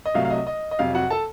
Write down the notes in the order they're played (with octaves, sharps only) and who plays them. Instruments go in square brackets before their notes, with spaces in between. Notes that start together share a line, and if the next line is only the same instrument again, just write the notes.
[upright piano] D#5
C2 C3 F#3 A3 F5
F5
D#5
D#5
D#5
F2 C3 F#3 F5
F#4 F#5
A4 A5